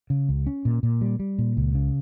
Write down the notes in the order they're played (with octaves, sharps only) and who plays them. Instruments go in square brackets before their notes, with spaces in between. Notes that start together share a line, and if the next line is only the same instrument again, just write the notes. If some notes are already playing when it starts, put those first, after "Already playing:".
[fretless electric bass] C#3
C#2
C#4
A#2
A#2
G3
G3
A#2
C#2
C#3